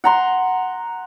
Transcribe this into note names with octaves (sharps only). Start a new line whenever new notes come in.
F#5 A#5 C6